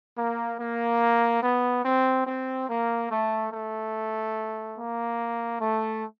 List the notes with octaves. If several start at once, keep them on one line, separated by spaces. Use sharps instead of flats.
A#3
A#3
B3
C4
C4
A#3
A3
A3
A#3
A3